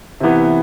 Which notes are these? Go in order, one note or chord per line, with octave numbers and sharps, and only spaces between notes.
C3 E3 B3